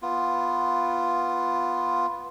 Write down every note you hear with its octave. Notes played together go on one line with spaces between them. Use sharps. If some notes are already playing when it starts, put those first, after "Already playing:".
B3 F4